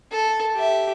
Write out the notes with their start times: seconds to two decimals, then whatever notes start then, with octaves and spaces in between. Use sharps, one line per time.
0.11 A4
0.55 G4 E5